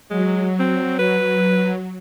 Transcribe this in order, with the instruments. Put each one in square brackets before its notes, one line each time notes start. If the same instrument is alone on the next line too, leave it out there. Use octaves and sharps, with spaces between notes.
[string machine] F#3 [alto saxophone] G#3
[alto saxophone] C4
B4